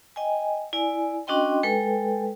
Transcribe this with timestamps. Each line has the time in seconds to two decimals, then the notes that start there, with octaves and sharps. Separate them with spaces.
0.16 D#5 G5 G#5
0.73 E4 D5 G#5
1.27 C#4 D4 F#4 D#5 G5 C6
1.63 G#3 A4 B4 G5